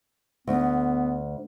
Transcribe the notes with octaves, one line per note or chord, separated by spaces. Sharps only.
D2 B3